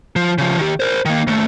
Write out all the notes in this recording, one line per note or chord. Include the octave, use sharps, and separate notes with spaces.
F3
C#3 F3
D#3 G4
A#4 C5
D#3 A#3
D#2 A3